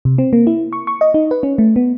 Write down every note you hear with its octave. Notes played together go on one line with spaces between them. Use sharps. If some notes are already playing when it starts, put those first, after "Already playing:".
C3
C4
A#3
E4
C#6
C#6
D#5
D#4
B4
C#4
A3
B3